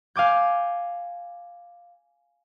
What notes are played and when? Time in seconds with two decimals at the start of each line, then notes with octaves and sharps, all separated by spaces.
0.16 F5 G#5 D6 G6